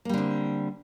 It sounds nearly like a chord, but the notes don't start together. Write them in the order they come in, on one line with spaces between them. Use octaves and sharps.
A#3 G3 D3 C4